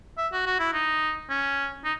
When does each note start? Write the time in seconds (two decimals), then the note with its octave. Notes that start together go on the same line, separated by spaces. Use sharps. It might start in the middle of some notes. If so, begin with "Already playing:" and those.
0.18 E5
0.33 F#4
0.46 F#4
0.59 E4
0.74 D#4
1.30 C#4
1.84 D#4